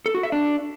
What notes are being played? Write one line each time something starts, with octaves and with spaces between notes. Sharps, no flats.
A4
F#4
E5
D4